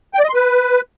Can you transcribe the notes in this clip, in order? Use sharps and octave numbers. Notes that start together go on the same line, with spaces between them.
G5
D5
D#5
C6
B4